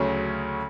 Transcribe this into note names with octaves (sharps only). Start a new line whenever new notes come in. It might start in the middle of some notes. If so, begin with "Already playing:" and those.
Already playing: D2 C#3 F#3 A3 C#4